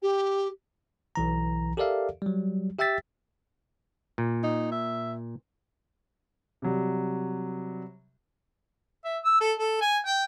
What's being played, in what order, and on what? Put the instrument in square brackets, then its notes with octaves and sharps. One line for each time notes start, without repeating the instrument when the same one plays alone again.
[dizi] G4
[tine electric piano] B1 E3 A#5
G4 A4 A#4 D5 E5 F5
F#3 G3
G4 E5 G5 E6 A6 B6
[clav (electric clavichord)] A#2
[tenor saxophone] D#4
E5
[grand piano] C3 F#3 G3
[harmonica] E5
E6
A4
A4
G#5
G5